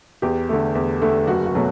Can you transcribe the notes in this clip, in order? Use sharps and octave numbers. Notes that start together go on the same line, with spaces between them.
E2 G4
D3 A3
E2
D3 A3
F#1 F#4
F#4
B2 F#3 A3